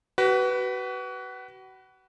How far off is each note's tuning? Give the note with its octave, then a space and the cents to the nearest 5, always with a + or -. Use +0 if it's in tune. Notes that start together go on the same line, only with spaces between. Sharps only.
F#4 +35 B4 +0